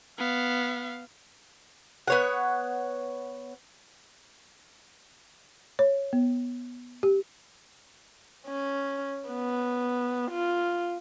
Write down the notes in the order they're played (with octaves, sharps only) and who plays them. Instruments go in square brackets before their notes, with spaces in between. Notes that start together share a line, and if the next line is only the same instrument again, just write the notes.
[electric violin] B3 F5
[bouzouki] B3 C#5 F#5
[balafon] C#5
B3
G4
[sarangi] C#4
B3
F4